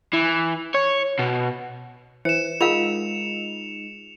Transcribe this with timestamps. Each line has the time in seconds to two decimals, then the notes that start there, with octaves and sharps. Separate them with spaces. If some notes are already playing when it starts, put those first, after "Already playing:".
0.13 E3
0.75 C#5
1.19 B2
2.25 E3 C5 C#7 E7
2.61 G#3 D#4 F4 A#4 F5 F7